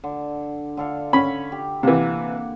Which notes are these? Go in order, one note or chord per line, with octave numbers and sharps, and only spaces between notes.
D3
D3 A4 F5
C#4 B5
G4
C3 E3 A#3 F#5